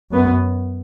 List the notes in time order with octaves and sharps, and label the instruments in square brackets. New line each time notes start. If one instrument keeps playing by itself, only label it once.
[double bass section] F#2 B3